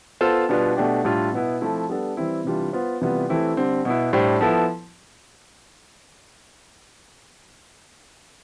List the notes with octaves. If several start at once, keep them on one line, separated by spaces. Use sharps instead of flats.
B3 F4 A4 C5
B2 G3 B3 D4 F4
B2 A3 D4 G4
A2 G3 D4 F4
B2 B3 E4
F3 A3 C4 E4
G3 B3 D4 A4
E3 G3 C4 E4
C3 E3 G3 D4 F4
B3 F4 C5
C3 E3 G3 B3 F4
E3 A3 C4 E4 G4
D3 G3 C4
B2 B3 E4
A2 G3 D4 G4 C5
F3 B3 E4 A4